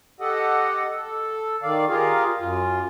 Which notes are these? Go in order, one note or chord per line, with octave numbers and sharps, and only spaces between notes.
G4 A4 D#5 F#5
A4
D#3 D5 F5
F4 G4 G#4 A#4 F5
F#2 F4